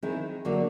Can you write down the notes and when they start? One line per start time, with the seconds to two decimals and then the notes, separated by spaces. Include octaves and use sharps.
0.03 D#3 G#3 C4 E4
0.45 D3 F#3 A#3